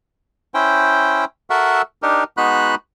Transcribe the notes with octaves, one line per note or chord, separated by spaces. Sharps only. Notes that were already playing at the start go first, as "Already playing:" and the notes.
C#4 E4 C5 G5
F#4 A4 A#4 E5 F#5
D4 D#4 G4 A#4
G#3 B3 D#4 F#4 B5 F#6